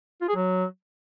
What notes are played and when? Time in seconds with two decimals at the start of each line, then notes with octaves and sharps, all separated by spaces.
0.22 F4
0.29 G#4
0.36 F#3